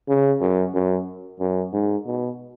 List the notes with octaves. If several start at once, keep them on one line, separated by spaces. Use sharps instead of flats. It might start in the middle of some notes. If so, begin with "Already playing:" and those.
C#3
F#2
F#2
F#2
G#2
B2